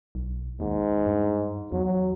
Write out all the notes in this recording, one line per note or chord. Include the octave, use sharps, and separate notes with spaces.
B1
D#2 G#2
G2
E2 F#3